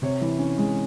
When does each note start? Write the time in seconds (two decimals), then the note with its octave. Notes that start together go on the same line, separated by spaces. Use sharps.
0.02 C3 C#5
0.21 E3
0.39 C#4
0.58 G#3